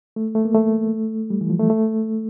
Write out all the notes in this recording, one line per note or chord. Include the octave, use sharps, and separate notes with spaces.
A3
A3
A#3
A3
G3
E3
F3
A3
A3